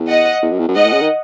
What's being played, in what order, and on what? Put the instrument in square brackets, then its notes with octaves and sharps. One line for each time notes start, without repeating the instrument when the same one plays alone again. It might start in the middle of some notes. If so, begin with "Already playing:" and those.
Already playing: [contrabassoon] E2
[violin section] D#5 F#5
[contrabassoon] E2
F#2
E2
F#2
[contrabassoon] G#2 [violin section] D#5 F#5
[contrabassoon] A2
C#3
D#3